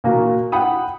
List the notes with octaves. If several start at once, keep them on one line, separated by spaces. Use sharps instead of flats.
A#2 A#3 F#4
F#5 G5 B5 D#6